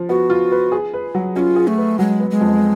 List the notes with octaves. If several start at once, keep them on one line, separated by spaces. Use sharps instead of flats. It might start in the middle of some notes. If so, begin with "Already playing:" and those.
Already playing: F3
B3 F#4
F4
B4
G#4
B4
F#3
C#4 F4 F#4
G#4
A3
B4
F#3 G#3
B3
G#3
F2